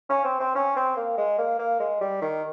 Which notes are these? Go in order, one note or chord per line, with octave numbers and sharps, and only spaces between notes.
C#4
C4
C4
C#4
C4
A#3
G#3
A#3
A#3
G#3
G3
D#3